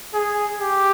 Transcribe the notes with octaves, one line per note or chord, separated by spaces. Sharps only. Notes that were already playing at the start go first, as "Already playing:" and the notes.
G#4
G4